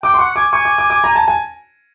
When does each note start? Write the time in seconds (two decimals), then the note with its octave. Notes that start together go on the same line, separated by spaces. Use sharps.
0.03 G5 D6
0.14 C6
0.19 F#5 C#6
0.36 G#5 D6
0.53 G#5 C#6
0.65 D6
0.78 D6
0.90 D6
1.04 A#5
1.15 A5
1.28 G#5